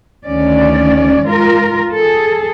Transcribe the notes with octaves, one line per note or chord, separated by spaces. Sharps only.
D2 D#3 C#4 D5
G#2 F4 A#4
G#4 A4